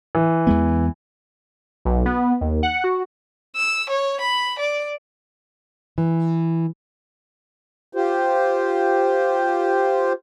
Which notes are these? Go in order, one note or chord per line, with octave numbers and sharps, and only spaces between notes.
E3
E2 G#3 B3
B1
B3
D#2
F#5
F#4
E6
C#5
B5
D5
E3
F4 G4 C5